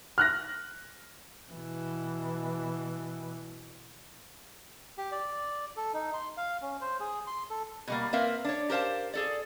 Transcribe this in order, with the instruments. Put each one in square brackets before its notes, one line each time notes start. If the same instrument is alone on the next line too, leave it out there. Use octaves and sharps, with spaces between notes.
[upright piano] F6 F#6 A#6
[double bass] B2 E3
[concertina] G4
D5
A4
D#4
C6
F5
C#4
C5
G#4
C6
A4
[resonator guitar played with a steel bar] B2 G3 A#3
A#3 C4 A#4 B4 E5 F5
D4 C#5
G4 A#4 C5 F5 A5
G#4 A4 D5